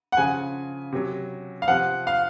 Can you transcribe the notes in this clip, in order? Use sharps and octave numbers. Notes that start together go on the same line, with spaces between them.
F#5
C#3 F3 G#5
C3 F#3
F5
C3 F3 F#5
F5